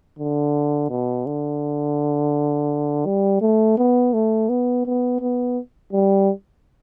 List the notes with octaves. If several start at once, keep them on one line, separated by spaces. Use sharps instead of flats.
D3
B2
D3
G3
A3
B3
A3
B3
B3
B3
G3